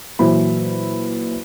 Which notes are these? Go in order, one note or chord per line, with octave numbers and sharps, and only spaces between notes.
A#2 E3 F#3 E4 C5 B5